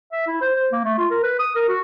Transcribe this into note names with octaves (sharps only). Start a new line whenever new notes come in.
E5
E4
C5
C5
A#3
A3
F4
A#4
B4
D#6
A#4
F#4